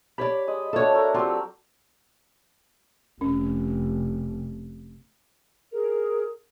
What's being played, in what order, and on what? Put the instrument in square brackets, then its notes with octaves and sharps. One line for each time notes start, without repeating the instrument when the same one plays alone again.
[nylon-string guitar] G4 C#5 D5 [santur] B5
[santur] G#3 D#5
[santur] A3 D4 F#4 [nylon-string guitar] A4 C#5
[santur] A3 A#4 A#5
[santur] F#3 C4 G4 [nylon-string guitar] F4
[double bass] F1 [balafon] C#4
[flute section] G#4 A#4